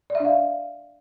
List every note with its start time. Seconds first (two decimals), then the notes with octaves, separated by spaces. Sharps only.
0.10 D5
0.15 E5
0.20 D4
0.25 F5